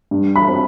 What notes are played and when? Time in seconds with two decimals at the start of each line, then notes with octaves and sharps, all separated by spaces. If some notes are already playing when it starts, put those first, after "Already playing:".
0.11 G2
0.36 B5
0.48 C4